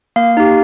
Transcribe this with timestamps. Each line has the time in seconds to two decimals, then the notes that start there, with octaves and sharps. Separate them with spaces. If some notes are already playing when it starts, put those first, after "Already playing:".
0.16 A#3 F5
0.37 D#4 G4